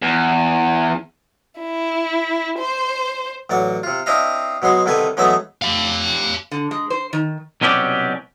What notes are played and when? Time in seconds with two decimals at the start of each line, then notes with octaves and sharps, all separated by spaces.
0.02 E2
1.60 E4
2.58 C5
3.50 A1 F#3 D5 F#5
3.83 C3 F4
4.06 C4 D4 E4 D#5 F5
4.62 B2 F#3 G#3 C6
4.86 C2 D3 D#3 A4 B4 G#5
5.17 E3 F#3 G#3 A3 B3 E5
5.62 G4 F5
6.51 D3
6.71 G#3
6.90 C5
7.13 D#3
7.61 C2 B2 F#3 C#4 G4 D5